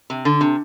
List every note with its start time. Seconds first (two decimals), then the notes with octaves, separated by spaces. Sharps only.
0.10 C3
0.25 D3
0.41 C3